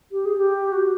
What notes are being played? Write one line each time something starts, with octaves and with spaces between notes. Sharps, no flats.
G4
G#4
G4
F#4